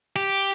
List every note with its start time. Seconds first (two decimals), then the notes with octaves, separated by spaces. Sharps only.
0.16 G4